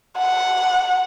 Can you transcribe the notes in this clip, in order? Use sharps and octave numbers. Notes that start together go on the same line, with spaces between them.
F#5